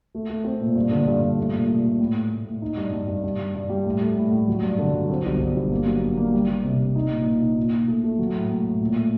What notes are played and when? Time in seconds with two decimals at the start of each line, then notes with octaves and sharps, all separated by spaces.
0.15 A3
0.30 A3
0.44 C4
0.61 A#2
0.76 G2
0.91 D3
1.07 G2
1.23 G2
1.38 A3
1.53 A#2
1.69 A#2
1.85 A3
1.99 A2
2.15 A2
2.31 A2
2.46 A2
2.62 D#4
2.77 G2
2.93 G2
3.08 G2
3.23 G2
3.39 G3
3.55 G2
3.69 G3
3.86 A2
4.01 A3
4.17 A2
4.32 A2
4.48 F#3
4.63 G2
4.78 D3
4.94 F#3
5.09 C4
5.25 G1
5.40 G1
5.56 G1
5.72 A#3
5.86 F#3
6.02 G2
6.17 A#3
6.34 G3
6.48 G3
6.64 C3
6.80 C3
6.95 D#4
7.11 A#2
7.26 A#2
7.42 D#4
7.57 A#2
7.73 A#2
7.88 A3
8.04 A3
8.18 F#3
8.35 A2
8.50 A2
8.65 A2
8.81 A#2
8.96 A3